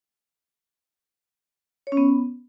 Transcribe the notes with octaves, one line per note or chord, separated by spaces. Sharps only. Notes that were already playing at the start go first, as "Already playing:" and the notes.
C#5
C#4
B3